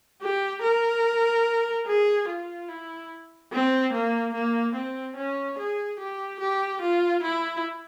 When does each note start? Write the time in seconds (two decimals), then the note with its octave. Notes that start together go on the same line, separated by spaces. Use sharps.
0.22 G4
0.63 A#4
1.87 G#4
2.28 F4
2.69 E4
3.52 C4
3.93 A#3
4.34 A#3
4.75 C4
5.16 C#4
5.58 G#4
6.00 G4
6.40 G4
6.82 F4
7.23 E4